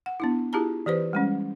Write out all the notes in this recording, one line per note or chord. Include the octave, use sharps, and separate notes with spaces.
F#5
B3 D4 E4
E4 F4 G4 G#4 A5 A#5
E3 G4 B4 C5
G3 G#3 C#4